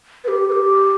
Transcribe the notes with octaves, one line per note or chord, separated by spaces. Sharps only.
B4
G4
B4
G4